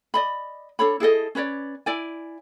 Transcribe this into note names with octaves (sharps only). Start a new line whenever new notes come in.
D5 D#5 B5
D4 A4 C#5 B5
E4 G#4 A4 D#5
C#4 B4 C#5 D5
E4 D5 G#5